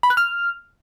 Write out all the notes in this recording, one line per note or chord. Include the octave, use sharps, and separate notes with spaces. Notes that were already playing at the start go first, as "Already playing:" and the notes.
B5
F#6
F6